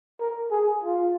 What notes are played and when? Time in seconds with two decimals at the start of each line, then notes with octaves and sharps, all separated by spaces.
0.20 A#4
0.51 G#4
0.84 F4